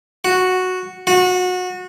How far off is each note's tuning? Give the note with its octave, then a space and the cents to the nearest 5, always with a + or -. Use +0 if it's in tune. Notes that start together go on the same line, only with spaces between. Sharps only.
F#4 -5
F#4 -25